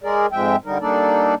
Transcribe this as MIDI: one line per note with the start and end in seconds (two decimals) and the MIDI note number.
0.04 0.26 56
0.04 0.26 68
0.04 0.26 70
0.04 0.26 74
0.32 0.56 41
0.32 0.56 44
0.32 0.56 53
0.32 0.56 56
0.32 0.56 76
0.32 0.56 79
0.65 0.78 50
0.65 0.78 55
0.65 0.78 63
0.65 0.78 70
0.81 1.34 55
0.81 1.34 58
0.81 1.34 62
0.81 1.34 63
0.81 1.34 69
0.81 1.34 74